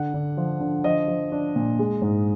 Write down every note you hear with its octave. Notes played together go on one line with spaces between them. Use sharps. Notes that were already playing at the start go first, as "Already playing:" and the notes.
Already playing: D3 F#5
D3
F3
D3
F3 D#5
F3
D4
A#2
G#3
G#2